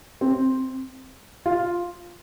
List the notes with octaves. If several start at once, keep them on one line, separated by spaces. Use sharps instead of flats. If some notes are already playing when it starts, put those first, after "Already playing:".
C4
F4